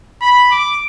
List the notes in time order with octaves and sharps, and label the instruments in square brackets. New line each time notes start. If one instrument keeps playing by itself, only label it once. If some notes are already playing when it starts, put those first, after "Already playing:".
[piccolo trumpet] B5
D6